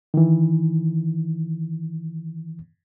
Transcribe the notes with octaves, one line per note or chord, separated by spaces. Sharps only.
D#3 E3